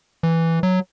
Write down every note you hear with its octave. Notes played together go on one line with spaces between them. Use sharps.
E3
F#3